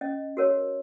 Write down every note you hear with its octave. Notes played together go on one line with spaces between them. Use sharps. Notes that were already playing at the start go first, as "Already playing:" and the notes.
C#4 D#5
F#4 A#4 C#5